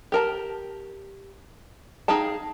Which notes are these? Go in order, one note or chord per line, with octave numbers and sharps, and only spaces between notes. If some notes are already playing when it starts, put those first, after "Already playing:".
G4 A#4 A5
D#4 G#4 F5 G5 A5